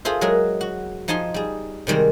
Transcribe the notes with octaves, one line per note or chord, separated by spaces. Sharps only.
F4 G#4 A4 C5 E5
F#3 G#3 G#4 A#4
F#4
F3 D#4 G#5 A5 C6
G3 G#4
C3 D#3 G3 G#3